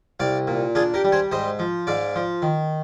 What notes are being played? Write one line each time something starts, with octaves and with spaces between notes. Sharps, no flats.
C2 D5 F5
A#2
D4 F4 G#4
G4 A#4
G3
G#4 C5
G#2 C5 D#5
F3
G#2 D5 F5
F3
D#3